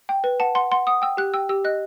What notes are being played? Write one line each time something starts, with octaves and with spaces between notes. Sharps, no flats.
G5
B4
F#5 A5
F#5 C6
F#5 C6
F#5 D#6
G5 E6
G4 F#6
G5 E6
G4 E6
D#5 F#6